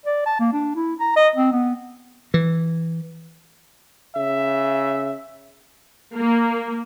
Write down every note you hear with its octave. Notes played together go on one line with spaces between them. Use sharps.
D5
A5
A#3
D4
E4
A#5
D#5
C4
B3
E3
C#3 E5
A#3